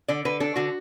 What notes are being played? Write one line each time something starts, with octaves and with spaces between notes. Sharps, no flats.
D3 D5
D3 B4
D4 A4
D3 F#4